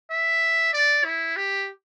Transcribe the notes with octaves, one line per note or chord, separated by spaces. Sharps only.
E5
D5
E4
G4